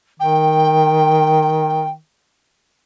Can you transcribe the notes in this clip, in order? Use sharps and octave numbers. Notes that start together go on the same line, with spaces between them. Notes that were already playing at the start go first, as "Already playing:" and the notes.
D#3 G5